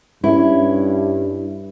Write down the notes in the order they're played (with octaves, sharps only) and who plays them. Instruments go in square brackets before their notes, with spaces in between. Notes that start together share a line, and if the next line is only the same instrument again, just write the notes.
[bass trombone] G2 [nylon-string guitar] C#4 E4